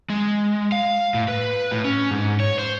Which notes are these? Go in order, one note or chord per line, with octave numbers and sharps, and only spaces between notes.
G#3
F5
A2
B4
A2
C#4
G#2
C#5
C5